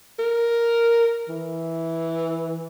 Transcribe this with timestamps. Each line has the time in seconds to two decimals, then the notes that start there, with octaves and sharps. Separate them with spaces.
0.19 A#4
1.29 E3